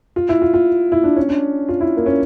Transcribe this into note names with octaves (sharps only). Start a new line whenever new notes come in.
F4
E4
F4
F4
E4
D4
C#4
D4
F4
E4
A#3
C#4